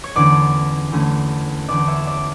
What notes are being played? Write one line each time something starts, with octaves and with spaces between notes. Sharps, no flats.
C#5
E2 D3 A3 C#4 D5
E2 D3 A3 C#4
E2 D3 A3 C#4 D5
C#5 E5
D5